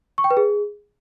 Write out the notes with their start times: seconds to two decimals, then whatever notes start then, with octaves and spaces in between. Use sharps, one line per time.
0.18 C#6
0.24 G5
0.31 B4
0.37 G#4